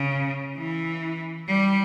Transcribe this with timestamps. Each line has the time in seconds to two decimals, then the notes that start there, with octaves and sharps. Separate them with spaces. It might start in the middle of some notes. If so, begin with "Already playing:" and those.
Already playing: C#3
0.57 E3
1.47 G3